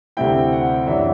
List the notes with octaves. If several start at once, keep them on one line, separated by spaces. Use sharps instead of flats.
D2 C3 G3 C4 E4 G5
F#5
F#2 E3 G3 D4 E5